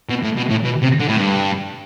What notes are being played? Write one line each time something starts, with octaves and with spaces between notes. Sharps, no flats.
B2
A2
B2
A2
B2
C3
D3
A2
G2